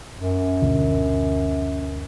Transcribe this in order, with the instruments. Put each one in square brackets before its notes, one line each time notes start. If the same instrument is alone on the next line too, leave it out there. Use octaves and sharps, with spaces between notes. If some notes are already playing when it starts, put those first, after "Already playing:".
[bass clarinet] F#2
[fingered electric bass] D2 B2 D3